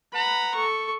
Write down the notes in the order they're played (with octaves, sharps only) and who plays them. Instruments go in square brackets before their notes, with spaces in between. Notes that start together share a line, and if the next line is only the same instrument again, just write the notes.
[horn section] B4 F#5 A#5 [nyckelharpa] B5
[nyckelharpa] A4 C#6